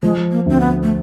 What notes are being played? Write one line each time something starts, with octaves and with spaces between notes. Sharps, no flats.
F3 G#3
A#3
D2 C4
B3
A3